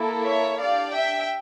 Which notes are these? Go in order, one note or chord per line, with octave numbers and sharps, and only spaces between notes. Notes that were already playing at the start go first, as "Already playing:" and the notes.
Already playing: A#3 E4 A4
C#5 E5
D4 G4 D5 F5
E5 G5